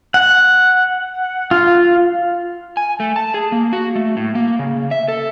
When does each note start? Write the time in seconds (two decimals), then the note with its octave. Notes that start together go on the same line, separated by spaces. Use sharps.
0.14 F#5
1.51 F4
2.77 G#5
3.00 A3
3.16 A5
3.34 G#4
3.52 A#3
3.73 F#4
3.96 A3
4.17 A2
4.35 A#3
4.59 C#3
4.91 E5
5.08 A4